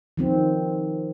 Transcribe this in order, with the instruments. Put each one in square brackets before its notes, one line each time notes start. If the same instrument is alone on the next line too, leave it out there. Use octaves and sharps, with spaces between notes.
[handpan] D#3 F3 C4